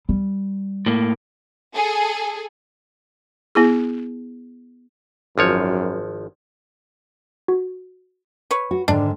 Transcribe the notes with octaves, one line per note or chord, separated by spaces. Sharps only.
G3
A2 A#3
G#4 A4
B3 E4 G#4
G#1 F#2 F3 C#5
F#4
B4 C#5
F#4
G#2 D3 D#3 D4